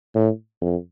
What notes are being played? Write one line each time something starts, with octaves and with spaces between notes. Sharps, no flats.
A2
F2